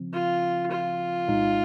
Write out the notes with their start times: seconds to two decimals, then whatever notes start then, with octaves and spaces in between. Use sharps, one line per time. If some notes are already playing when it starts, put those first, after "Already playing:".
Already playing: C#3 F3 C4
0.13 F4
0.71 F4
1.28 C2 A#2 G#3 D#4